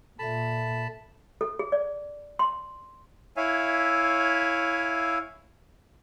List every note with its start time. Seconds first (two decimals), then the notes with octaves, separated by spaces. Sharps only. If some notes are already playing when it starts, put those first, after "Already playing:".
0.19 A#2 A4 E5 A5 B5
1.41 A4
1.59 G#4
1.72 D5
2.39 C6
3.36 E4 C#5 E5 F5 G#5